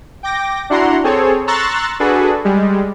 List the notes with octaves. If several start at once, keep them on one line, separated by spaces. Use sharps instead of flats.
G5 D6 A#6
D4 E4 F#4 F#5 A#5 C6
C4 G#4 A4 C#5
A#5 C6 C#6 E6 F#6 A6
D4 F#4 G#4 A4 B4
G3 G#3